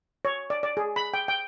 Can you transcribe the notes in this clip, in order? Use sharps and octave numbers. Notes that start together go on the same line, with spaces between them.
C#5
D5
D5
G#4
B5
G5
G5